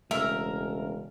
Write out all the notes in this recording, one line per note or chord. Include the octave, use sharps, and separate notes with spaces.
E1 C#3 A3 A#4 E5 E6